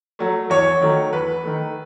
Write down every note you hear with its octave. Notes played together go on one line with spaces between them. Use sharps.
F#3 A3
E2 C#5
D#3 F#3 A3
E2 B4
D#3 A3